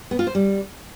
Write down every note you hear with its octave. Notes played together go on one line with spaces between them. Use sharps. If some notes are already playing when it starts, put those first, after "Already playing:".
B3
F4
C5
G3